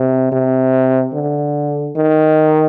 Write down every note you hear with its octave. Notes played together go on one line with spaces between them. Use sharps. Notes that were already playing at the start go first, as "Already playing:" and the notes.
Already playing: C3
C3
D3
D#3